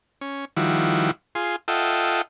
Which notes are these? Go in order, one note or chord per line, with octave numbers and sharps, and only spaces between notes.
C#4
D#3 F3 G3 E4 F#4
F4 G#4 C6
F4 A4 D#5 E5 F#5 G5